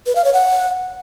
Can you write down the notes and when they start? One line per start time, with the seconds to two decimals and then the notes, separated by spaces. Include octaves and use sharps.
0.06 B4
0.15 F5
0.24 C#5
0.33 F#5